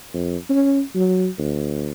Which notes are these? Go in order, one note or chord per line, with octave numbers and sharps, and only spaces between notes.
F2
C#4
F#3
D2